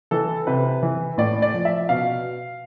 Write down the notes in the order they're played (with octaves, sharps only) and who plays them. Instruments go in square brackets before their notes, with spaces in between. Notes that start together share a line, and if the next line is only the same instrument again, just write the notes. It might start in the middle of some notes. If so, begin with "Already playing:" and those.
[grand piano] E3 A4
C3 B4
E3
A2 D5
D5
F3
E5
B2 F5